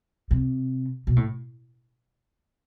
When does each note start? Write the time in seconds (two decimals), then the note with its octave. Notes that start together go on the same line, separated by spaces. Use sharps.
0.31 C3
1.07 B2
1.16 A2